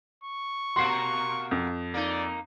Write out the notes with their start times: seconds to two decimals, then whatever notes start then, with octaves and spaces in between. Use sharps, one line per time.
0.24 C#6
0.76 B2 A#3 F#4 C6 C7
1.51 F2
1.94 A#3 D#4 D5